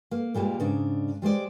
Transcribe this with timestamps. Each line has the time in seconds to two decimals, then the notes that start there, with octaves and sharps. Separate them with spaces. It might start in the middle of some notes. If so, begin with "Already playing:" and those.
0.11 A#3
0.34 A#2 G3 G#3 A#3
0.60 G#2 C#3 D4
1.22 G3 G#3 C5 D5